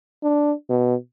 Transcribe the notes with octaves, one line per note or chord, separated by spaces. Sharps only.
D4
B2